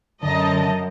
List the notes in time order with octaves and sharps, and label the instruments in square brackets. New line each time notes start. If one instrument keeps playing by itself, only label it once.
[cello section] F#2 [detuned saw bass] D3 [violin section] D#5 A5 A#5